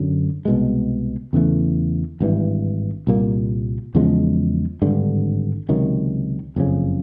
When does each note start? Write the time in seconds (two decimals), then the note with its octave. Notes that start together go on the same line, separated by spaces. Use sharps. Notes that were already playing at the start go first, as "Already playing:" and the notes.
Already playing: F#2 D3 F#3
0.45 C2 B2 G#3
1.33 E2 C#3 E3 A3
2.20 G#1 G2 E3
3.07 C2 A#2 G3 A#3
3.95 E2 C#3 F3 G#3
4.82 G#1 G2 D3
5.69 C#2 C3 D#3 F#3
6.56 F#1 F2 C#3